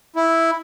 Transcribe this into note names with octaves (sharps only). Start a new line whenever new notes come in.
E4